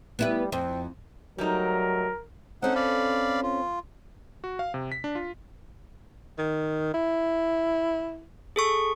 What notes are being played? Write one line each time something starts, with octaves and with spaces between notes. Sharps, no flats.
G3 B3 E4 B4
F2 C4
F#3 G3 A3 D#4 A#4
C4 C#4 D#4 A4 F#5
D5 F5 B5
F4
F#4
F5
C3
B6
D4
F4
D#3
E4
G#4 A4 C#6